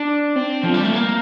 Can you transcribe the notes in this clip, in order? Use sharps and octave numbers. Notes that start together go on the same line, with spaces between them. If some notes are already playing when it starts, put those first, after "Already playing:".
Already playing: D4
C4
F3
G3
A3
A#3